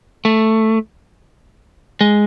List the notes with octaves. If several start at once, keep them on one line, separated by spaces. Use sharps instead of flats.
A3
G#3